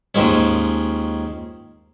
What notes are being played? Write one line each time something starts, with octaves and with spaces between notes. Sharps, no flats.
D#2 D#3 F3 G#3 C#4